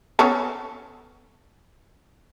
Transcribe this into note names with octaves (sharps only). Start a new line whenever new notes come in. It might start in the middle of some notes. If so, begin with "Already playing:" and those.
B3 C#4 A4